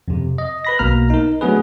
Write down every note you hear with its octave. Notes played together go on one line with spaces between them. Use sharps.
F2 C3
D#5
B4 B5 A#6
B1 B2 A#3 A#5 F6
D#4 A#4
F#3 A3 B3 D4 G#4 B4